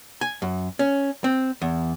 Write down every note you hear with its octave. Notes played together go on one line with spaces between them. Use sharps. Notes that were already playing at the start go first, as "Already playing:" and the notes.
G#5
F#2
C#4
C4
E2